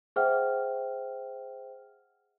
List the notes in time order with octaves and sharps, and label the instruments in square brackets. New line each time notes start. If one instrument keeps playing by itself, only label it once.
[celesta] G#4 C5 E5 F#5 G5 F6